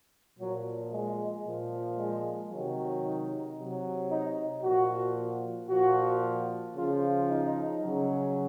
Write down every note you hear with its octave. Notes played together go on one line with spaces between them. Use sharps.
A#2 F3 F#3
G#3
A#2 F3
G#3
C3 D#3 F#3
D#4
C3 F#3
D#4
A#2 F3 F#4
A#2 F3 F#4
C#3 F3 F4
D#4
C#3 F#3